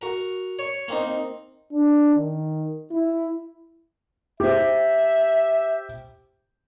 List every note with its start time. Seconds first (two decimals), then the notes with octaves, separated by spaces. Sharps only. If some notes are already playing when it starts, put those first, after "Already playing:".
0.02 F#4 A#4
0.59 C#5
0.88 A#3 C4 D#4
1.72 D4
2.16 D#3
2.91 E4
4.40 G4 C5 E5